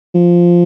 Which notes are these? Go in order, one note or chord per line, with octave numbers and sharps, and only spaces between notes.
F3